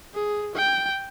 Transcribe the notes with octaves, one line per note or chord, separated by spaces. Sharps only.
G#4
G5